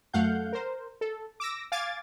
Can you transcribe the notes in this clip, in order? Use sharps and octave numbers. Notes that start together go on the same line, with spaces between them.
F#2 A3 F5 F#5 G6
A#4 C5
A4
D6 E6 A#6
F5 G#5 D6 G#6 A6